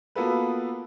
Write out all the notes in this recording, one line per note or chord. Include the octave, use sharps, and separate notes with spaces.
A#3 B3 F4 F#4 A4 B4